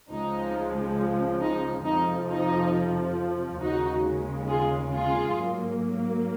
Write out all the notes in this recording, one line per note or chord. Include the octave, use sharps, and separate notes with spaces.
C#2 C#3 F3 G#3 D#4
D#4
F2 C3 F3 D#4
D#4
D#2 C#3 G#3 D#4 F#4
F4 G#4
F4 G#4
G#2 F#3 A#3